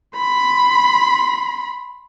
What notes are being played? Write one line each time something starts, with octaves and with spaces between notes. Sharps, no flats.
B5 C6